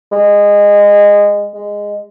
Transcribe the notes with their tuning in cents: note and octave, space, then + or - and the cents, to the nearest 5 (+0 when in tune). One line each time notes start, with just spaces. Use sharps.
G#3 -20
G#3 -10